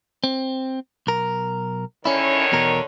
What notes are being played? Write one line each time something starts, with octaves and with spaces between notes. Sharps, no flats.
C4
B1 A#4
D3 D#3 C#4 E4 C#5
E2 B2 A#4